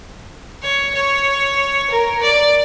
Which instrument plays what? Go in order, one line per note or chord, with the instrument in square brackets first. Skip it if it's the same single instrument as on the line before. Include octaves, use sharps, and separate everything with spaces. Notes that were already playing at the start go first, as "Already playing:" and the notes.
[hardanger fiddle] C#5
C#5
A#4
D5